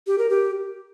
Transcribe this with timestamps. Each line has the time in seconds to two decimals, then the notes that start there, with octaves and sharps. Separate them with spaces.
0.07 G4
0.18 A#4
0.30 G4